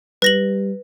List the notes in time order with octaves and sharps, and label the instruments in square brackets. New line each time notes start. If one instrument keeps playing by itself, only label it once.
[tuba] G3 [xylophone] B4 A#6 F#7